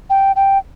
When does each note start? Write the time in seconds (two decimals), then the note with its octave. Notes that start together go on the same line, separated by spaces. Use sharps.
0.10 G5
0.36 G5